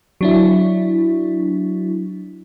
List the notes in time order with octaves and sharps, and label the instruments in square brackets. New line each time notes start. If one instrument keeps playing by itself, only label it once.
[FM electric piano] F#3 D4 E4